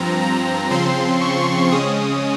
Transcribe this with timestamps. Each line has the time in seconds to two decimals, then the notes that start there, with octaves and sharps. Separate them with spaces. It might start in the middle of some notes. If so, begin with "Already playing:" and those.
Already playing: G2 F3 C4 A#5
0.21 A#5
0.70 C#3 F3 C4 C6
1.21 C#6
1.71 C#3 G#3 C#4 D#6